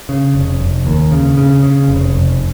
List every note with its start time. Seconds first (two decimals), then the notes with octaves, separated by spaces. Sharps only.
0.09 C#3
0.35 F1
0.60 F1
0.86 D#2
1.11 C#3
1.37 C#3
1.63 C#3
1.88 F1
2.15 F1